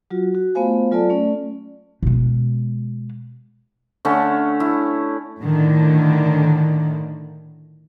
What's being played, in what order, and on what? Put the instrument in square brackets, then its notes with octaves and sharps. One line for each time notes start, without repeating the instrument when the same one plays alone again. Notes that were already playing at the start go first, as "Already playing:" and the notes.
[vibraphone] F#3 F4 F#4
F#4
A3 B3 F4 C5 F5 G#5
F#3 F4 A4 D5 A5
A3 C#4 D5
[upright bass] B2 G#3
[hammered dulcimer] D3 A3 C#4
E4
[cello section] A2 D3 D#3